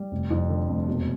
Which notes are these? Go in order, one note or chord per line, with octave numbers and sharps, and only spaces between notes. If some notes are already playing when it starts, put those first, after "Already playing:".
Already playing: G3
F1
F2
D3
F1
E1